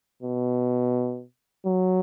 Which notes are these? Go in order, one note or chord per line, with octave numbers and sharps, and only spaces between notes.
B2
F#3